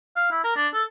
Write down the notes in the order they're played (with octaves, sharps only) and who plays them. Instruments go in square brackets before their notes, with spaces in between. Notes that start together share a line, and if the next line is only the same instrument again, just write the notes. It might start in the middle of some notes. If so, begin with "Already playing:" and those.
[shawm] F5
E4
A#4
D4
A4